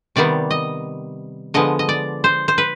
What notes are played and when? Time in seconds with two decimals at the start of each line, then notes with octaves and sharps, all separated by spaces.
0.16 C3 D#3 G3 B3 D5
0.51 D#5
1.54 D3 F3 G#3 B3 D#5
1.79 D#5
1.89 D5
2.24 C5
2.48 C5
2.58 B4